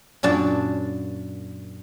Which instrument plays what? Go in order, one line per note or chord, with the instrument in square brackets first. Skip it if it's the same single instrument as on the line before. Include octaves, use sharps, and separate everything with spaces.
[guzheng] F#2 A#2 D4 A5